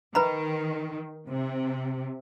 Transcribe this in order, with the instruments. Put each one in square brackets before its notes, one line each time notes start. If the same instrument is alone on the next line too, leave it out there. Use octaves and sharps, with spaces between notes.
[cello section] D#3 [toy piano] B4 A#5 B5
[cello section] C3